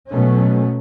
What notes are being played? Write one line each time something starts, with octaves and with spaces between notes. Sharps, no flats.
B2 F#3 A3 C#4